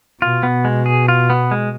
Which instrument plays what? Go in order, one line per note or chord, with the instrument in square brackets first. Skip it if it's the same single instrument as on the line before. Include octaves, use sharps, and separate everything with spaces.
[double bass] B2 [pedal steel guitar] F4
[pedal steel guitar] B3
G#3
G#4
F4
B3
G#3